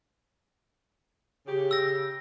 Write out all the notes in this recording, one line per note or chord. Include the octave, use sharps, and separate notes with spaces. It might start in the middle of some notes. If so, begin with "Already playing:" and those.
C#3 G4
E6 A#6